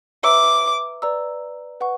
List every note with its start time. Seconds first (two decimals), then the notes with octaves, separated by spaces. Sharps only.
0.24 B4 E5 A#5 D6 E6
1.02 B4 D5 A#5 E6
1.80 B4 F#5 C#6